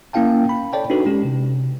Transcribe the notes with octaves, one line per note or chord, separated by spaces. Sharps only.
A#3 C#4 E4 F5 G5 A5
B5
A4 C#5 D5 G5 A5
D4 D#4 F#4 A4 B4
G#3 C#4 G4
C3